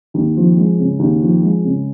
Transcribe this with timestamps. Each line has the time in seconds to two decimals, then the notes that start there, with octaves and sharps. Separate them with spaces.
0.14 D#2
0.36 F3
0.57 G#3
0.79 C#3
0.99 D#2
1.22 F3
1.42 G#3
1.64 C#3